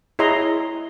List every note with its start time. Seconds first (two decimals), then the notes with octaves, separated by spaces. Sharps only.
0.19 E4 G#4 C#5 D#5 A#5 C6